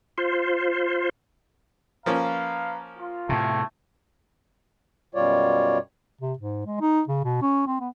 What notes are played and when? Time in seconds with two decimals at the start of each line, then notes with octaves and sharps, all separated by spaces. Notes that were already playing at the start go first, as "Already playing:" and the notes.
0.18 F4 C5
2.06 F3 A#3 C#4 B4 F5 A#5
2.99 F4
3.29 A2 C3 A3
5.15 F#2 B2 G3 F4 C#5 D5
6.21 C3
6.39 G#2
6.66 G#3
6.81 D#4
7.08 C#3
7.24 B2
7.42 C#4
7.67 C4
7.80 B3